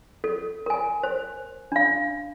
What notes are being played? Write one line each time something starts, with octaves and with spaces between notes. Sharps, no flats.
A4
A#4 G#5
C5
D4 F5